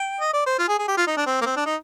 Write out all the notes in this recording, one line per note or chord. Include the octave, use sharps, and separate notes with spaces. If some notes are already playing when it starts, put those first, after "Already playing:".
Already playing: G5
D#5
D5
C5
F4
G#4
G#4
G4
F4
D#4
D4
C4
A#3
C4
D4
D#4